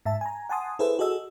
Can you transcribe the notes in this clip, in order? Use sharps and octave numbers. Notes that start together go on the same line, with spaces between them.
G#2 E5 A5
G#5 A#5
F#5 G#5 A5 C6 D#6
E4 G#4 A4 B4 C5 E5
F#4 G#4 A4 D#5 E6